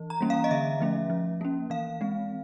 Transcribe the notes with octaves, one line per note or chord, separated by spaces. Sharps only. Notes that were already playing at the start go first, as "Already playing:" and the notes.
Already playing: E3
A#5
G3 A#3 C#4
F5
D#5
D3 E5
F3 A3 C#4
F3
A#3 C#4
E3 F5
G#3 C4